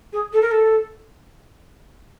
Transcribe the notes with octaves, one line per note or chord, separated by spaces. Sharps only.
G#4
A4
A#4
A4